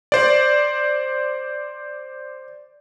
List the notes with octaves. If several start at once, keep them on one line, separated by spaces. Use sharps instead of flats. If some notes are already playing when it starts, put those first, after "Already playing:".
C5 D5